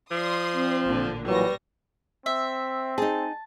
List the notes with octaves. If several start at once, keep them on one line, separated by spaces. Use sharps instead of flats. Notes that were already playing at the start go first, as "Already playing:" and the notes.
F3 D5 C6 D#6
C4
A1 A#2 D3
A#2 E3 F#3 G3 B4 C#6 A#6
C4 E5
D#4 G#4 A5